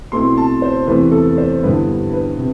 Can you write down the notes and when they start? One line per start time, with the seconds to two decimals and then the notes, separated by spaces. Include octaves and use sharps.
0.12 B2 A3 C4 E4 C6
0.37 A5
0.62 C5
0.87 E2 C3 E3 A3 E4 B4
1.12 A4
1.38 C5
1.63 G2 D3 G3 B3 E4 B4
2.13 B4
2.37 C3